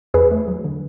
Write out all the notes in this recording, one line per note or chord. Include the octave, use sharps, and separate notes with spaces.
E2 G#4 B4
A3
F#3
D3